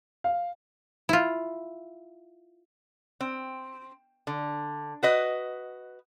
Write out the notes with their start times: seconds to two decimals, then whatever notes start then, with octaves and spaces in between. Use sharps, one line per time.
0.24 F5
1.09 E4 F4
3.21 C4
4.27 D3
5.03 F#4 B4 D#5